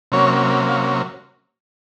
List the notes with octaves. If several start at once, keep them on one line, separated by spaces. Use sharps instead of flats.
C3 F#3 A#3 C#4 C#5
F5